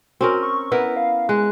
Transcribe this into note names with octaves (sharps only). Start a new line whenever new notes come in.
C4 C#4 F#4 A#4
C#6
B3 E4 A#4 B4
F5
G#3 F#6